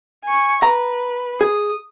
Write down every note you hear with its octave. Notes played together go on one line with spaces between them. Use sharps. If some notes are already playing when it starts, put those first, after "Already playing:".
G#5 C#6
B4 A#5
G#4 D#6